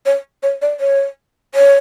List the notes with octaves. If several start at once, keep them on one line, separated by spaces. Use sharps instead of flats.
C#5
C#5
D5
C#5
C#5